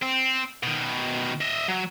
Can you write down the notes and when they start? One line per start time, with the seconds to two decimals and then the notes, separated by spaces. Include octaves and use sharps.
0.02 C4
0.63 B2 D#3
1.41 D#5 E5
1.68 F#3